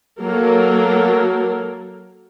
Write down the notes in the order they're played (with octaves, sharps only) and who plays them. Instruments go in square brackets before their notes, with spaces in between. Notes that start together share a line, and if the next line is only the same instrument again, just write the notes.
[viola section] F#3 A#3 A4 A#4